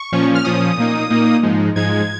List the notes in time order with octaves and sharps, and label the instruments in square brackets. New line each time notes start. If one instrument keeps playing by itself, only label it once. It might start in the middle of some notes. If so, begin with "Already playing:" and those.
Already playing: [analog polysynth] C#6
A#2 F3 C#4
F6
A#2 F3 C#4 D#6
A#2 A#3 D#4
A#2 A#3 D#4
G#2 F3 G#3 D#4
G#2 F3 G#3 D#4 G#6